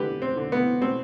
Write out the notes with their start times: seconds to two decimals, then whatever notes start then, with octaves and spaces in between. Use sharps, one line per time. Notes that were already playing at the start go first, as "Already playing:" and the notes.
Already playing: D3 G4 B4
0.22 C4
0.37 D3
0.52 B3
0.81 B2 C4